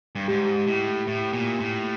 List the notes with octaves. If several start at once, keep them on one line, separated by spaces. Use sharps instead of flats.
G2
G#2 G4
A2
A2
A#2
A2